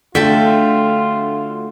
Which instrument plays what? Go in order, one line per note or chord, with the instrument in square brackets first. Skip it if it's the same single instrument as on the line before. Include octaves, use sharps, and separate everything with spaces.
[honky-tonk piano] D3 [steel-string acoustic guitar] A3 F#4 [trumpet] F4 [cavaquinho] E5 G5 A5